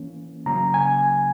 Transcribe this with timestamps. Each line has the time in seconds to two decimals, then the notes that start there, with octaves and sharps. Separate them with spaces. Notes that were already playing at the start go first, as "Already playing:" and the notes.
Already playing: E3 A#3 C#4
0.46 C#3 F#3 A#3 C#4 A#5
0.74 G#5